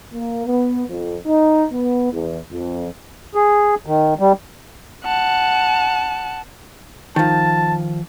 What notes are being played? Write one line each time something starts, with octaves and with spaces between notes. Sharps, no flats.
A#3
B3
F2
D#4
B3
E2
F2
G#4
D#3
G3
F#5 A5
D#3 F3 A5